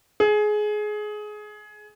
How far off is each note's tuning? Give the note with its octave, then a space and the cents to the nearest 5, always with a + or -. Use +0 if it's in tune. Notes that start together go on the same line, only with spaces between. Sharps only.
G#4 +20